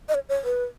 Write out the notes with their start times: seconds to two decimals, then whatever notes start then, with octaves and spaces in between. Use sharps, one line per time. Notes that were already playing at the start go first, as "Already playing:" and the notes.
0.09 D#5
0.14 C#5
0.29 C#5
0.44 B4